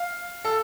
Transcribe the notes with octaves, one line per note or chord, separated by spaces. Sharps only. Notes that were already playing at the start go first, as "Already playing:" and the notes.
Already playing: F5
A4